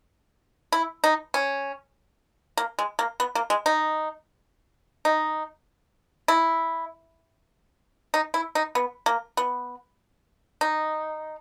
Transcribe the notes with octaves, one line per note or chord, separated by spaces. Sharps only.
E4
D#4
C#4
A#3
G#3
A#3
B3
A#3
G#3
D#4
D#4
E4
D#4
E4
D#4
B3
A#3
B3
D#4